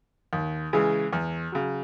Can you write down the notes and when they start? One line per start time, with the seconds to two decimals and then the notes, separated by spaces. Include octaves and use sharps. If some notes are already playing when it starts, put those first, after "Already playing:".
0.33 D#2
0.73 C#3 E3 G#3
1.13 E2
1.52 C#3 F#3